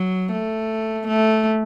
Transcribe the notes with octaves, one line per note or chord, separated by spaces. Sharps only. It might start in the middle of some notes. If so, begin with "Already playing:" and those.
Already playing: F#3
A3
A3